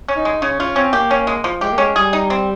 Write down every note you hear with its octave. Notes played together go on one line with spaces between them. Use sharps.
C#4
D#4
G#3
C#3 C#4
C#4 F4
C4 C#4
A#3 G4
C#4
G#3
F3
G#3 G4
A#3
G#3 C#4
G3 G#4
D#4
C4